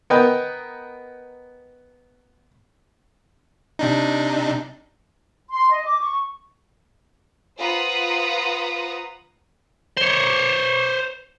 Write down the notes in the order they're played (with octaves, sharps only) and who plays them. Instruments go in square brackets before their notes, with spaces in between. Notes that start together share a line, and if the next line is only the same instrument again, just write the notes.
[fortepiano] B3 A#4 B4 D#5 G5
[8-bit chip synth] C3 D4 D#4
[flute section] C6
D#5
D6
C#6
[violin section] F4 B4 C5 F#5 A#5 D#6
[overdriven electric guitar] C5 C#5